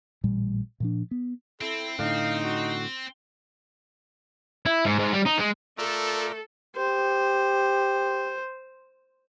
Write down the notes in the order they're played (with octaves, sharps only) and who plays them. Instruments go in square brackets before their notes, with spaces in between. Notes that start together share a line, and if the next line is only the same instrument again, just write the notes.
[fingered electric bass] A1 A#2 G3
A#2 F3 D4
B3
[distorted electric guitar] C4 [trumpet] E4 [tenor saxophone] A4
[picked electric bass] A2 D3 [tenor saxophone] D#4 [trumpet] F5
[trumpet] F#4
[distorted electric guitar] E4
G#2
G#2
G3
D#4
G#3
[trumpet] A3 [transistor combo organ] F4 A#4 D5 [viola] A4 [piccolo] E6
[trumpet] G4 [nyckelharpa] C5